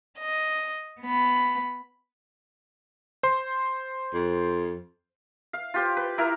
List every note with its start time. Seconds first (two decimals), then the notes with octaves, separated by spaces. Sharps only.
0.18 D#5
1.01 B3 B5
3.23 C5 C6
4.14 F2
5.53 F5
5.74 F4 G4 C5
5.97 B4
6.18 E4 A#4 F5 A#5